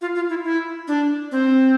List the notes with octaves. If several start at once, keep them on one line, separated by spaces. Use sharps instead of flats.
F4
F4
E4
E4
D4
C4